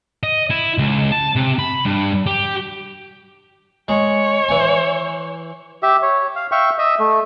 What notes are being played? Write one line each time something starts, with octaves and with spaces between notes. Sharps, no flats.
D#5
E4
C#2
A5
C3
B5
G2
G4
G#3 C#5
E3 G#5
G4 E5
C#5
F5
E5 F5 G5 C#6
D#5 E5
A3